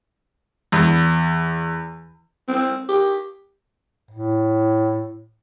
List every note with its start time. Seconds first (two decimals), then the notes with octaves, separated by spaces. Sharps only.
0.72 E2
2.48 C4
2.88 G4
4.11 A2